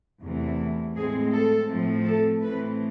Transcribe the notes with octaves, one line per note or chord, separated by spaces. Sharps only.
E2 C3 E3 A3
A2 G#3 C4 G#4
A4
A2 F3 A3 C4
A4
A2 E3 A3 C4 B4